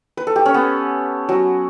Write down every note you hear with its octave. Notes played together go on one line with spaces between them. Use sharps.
B4
A4
G4
C#4
B3
F#3